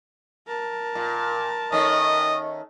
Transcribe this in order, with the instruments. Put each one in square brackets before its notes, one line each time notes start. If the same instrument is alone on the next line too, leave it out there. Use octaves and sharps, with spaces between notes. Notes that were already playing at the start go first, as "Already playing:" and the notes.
[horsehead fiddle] A#4 A5
[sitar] A#2
[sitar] D#3 A3 C#4 [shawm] D#5